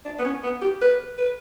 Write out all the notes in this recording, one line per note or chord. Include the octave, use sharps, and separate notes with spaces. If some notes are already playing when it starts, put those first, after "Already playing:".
D4
B3
C#4
B3
G4
B4
B4